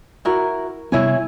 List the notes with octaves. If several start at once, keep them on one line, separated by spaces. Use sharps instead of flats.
E4 F#4 A#4
C3 G3 B3 E4 C#5 G#5